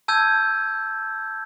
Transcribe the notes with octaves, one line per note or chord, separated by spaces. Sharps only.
A5 E6 G6 G#6